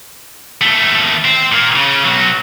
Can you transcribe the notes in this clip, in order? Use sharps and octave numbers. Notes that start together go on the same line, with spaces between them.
D#2 A3
C4
A#2 A#3
C#3
B1 F#3